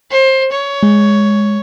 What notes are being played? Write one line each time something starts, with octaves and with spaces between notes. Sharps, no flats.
C5
C#5
G#3